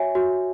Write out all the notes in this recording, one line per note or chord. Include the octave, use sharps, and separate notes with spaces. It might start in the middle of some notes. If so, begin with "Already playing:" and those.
Already playing: F#4 C#5 E5 G#5
F#4